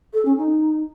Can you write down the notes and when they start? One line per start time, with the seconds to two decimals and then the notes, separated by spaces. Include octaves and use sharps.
0.13 A4
0.25 C#4
0.37 D#4